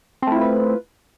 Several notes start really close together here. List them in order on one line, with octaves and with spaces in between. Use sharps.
C4 A3 E4 F4 B4